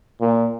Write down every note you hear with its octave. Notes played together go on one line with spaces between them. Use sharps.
A#2